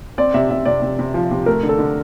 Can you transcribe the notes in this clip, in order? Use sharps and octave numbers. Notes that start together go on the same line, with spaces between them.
C4 D5
C3 E5
C3 E5
C3 D5
C3
C3
F3
C3
A3 A#4
D3
A4
D3